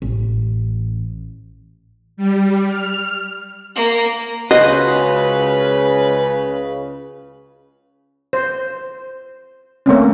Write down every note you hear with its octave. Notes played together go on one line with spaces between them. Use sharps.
A1
G3
F6
A#3
C#2 C#3 F#4 B4 C5 D#5
C5
A3 A#3 C4 C#4